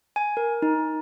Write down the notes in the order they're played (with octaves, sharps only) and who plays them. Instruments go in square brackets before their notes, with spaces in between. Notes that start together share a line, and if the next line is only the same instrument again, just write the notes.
[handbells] G#5
A#4
D#4